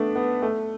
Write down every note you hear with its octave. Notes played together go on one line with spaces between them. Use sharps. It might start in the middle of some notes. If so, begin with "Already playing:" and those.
Already playing: A3 B3 D4
B3
A3